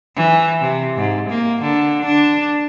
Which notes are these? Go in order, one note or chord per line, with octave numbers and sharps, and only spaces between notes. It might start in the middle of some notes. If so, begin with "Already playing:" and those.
E3
C3
G#2
A#3
D3
D4